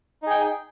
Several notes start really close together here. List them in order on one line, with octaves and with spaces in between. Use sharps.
D#4 G#4 G5